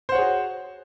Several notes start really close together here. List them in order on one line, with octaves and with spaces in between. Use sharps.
C5 F#5 C#5 G#4 F#4